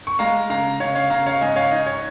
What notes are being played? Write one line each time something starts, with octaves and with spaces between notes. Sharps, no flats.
C#6
G#3 F5 A#5
C#3 F5 A#5
C#3 C#5 F5
C#5 F5
C#3 F5 A#5
C#5 F5
G#2 D#5 G#5
C#5 F5
D#4 D#5
C#5